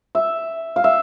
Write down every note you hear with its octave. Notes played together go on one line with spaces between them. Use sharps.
E5
F5
E5